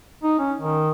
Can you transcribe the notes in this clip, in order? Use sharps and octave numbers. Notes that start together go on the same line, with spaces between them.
D#4
C#4
D#3